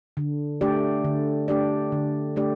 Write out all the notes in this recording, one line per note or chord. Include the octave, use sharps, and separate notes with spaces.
D3
A3 D4 G4 D5
D3
A3 D4 G4 D5
D3
A3 D4 G4 D5